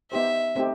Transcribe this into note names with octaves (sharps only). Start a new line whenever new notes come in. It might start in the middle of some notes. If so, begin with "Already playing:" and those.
B3 D#4 G4 C5 E5
A3 C4 D#4 G4